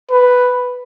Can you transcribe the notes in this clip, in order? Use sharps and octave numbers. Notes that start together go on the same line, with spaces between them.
B4